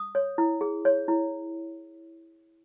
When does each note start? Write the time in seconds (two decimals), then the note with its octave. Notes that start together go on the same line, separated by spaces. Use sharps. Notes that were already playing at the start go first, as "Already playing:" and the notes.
Already playing: D#6
0.15 C#5
0.38 E4
0.61 G#4
0.85 C#5
1.08 E4